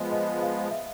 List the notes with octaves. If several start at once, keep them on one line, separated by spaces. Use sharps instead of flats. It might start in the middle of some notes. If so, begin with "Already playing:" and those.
Already playing: F3 G#3 B3 D#5
D#5
F5
E5